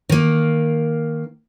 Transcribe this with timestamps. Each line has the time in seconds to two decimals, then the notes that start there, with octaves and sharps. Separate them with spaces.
0.09 D#3 A#3